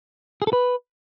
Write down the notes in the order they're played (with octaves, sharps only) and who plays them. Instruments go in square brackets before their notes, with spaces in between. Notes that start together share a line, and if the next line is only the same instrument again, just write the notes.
[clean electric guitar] G#4
A4
B4